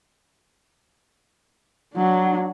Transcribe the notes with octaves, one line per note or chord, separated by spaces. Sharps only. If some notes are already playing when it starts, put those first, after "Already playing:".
F#3 D4